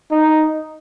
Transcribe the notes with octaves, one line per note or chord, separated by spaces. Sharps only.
D#4